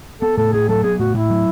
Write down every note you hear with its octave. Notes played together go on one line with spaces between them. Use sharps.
B3 A4
A2 A4
A2 G#4
F#3 A4
B3 G#4
A2 F#4
A2 E4
F#3